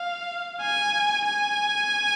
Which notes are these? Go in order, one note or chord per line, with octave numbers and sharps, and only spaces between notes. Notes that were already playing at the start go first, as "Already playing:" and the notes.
Already playing: F5
G#5
G#5